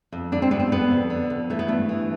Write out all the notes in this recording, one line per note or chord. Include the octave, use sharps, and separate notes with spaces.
F2
D3 D4
C4
F2 B3
C4
D3 B3
F2
D3
F2
E3 A3
B3
G2 A3
E3